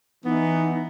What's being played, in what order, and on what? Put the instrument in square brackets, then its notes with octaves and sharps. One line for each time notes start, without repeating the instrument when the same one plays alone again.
[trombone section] E3 [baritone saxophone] B3 [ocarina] D#4